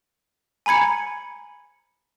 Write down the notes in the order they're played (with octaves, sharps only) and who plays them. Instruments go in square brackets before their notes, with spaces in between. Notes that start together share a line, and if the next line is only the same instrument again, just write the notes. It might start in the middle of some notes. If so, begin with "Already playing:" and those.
[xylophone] G#5 A#5 B5 G#6 C#7